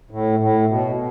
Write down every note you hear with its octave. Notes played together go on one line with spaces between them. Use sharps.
A2
A2
B2
B2